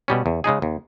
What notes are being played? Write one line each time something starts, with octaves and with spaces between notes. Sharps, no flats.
B2 G3 C#4
E2
C#3 G#3 D#4 G#4
D#2